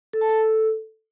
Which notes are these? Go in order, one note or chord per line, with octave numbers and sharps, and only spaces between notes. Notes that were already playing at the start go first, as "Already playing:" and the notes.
A4
A5
A4